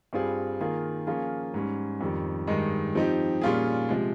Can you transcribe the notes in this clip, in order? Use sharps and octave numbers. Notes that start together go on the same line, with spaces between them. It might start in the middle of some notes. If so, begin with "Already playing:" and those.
G2 G3 C4 F4 G#4
D#3 A#3 F4 G#4
F3 A#3 C#4 F4 G#4
G#2 G3 C#4
F2 D#3 G3
G2 D#3 G#3 D#4
F3 C4 D#4 G4
A#2 G3 C#4 F4 G#4
C3 F3 G#3